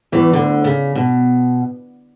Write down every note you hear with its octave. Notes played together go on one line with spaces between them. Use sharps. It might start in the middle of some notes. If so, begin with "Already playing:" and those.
E2 E3
D2 D3
C#3
B2